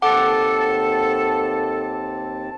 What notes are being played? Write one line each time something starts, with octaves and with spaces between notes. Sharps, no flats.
D#2 C4 A4 F#5 A5 D6